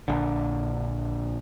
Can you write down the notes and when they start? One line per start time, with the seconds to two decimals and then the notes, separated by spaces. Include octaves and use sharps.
0.08 A#1 D3